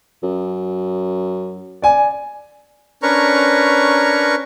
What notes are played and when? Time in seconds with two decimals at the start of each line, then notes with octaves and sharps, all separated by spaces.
0.23 F#2
1.82 D5 G#5
3.03 C#4 D4 A#4 B4 A#5 C#6